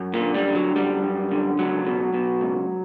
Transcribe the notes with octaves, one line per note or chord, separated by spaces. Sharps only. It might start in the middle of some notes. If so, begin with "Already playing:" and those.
Already playing: F#2
A#2 A#3
D3
G3
D3
F#3
F#2 G3
F#2
D3
C#2 F#3
B2
B2
C#2